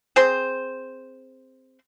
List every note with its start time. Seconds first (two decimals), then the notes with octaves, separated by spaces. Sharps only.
0.16 C4 G#4 C5